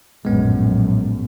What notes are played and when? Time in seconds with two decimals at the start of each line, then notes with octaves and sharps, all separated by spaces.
0.25 A#1 F#2 A2 G#3 B3